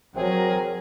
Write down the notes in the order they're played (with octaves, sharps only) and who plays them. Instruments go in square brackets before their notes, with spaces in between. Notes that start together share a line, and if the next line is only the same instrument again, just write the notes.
[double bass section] F#3 [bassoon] C4 [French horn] G#4 [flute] A#4